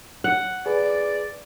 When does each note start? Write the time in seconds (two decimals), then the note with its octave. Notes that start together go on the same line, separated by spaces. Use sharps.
0.24 F#5
0.66 G#4 B4 D5